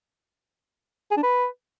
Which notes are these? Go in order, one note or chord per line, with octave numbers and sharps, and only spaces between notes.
G#4
D4
B4